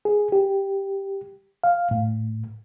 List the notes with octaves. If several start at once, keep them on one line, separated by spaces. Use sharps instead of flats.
G#4
G4
F5
A2